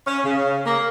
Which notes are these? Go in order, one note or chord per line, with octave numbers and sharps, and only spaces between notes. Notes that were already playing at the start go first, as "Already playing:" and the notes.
C#4
C#3
A#3